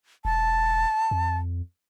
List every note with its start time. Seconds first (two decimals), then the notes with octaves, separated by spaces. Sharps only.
0.25 E1 A5
1.11 F2